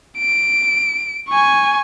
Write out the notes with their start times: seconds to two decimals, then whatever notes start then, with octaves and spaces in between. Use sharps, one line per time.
0.18 D7
1.30 G#5 C#6